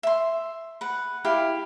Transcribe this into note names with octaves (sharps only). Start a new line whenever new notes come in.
E5 C6
B4 F#5
E4 G4 F5